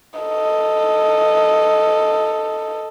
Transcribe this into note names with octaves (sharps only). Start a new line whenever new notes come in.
A4 D#5